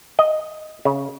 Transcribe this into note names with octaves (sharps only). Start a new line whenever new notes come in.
D#5
C#3